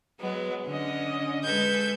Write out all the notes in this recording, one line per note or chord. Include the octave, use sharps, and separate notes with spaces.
F#3 G#3 B3
D3 C#4 D#5
G#3 A4 B4 G6 G#6